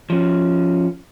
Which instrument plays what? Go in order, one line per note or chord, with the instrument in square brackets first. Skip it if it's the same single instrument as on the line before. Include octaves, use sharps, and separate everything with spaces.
[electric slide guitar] F3 C#4